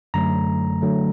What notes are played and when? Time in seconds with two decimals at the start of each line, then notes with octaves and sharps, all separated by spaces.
0.14 F#2 D3 F#3 A3 A#5
0.82 D3 F#3 A3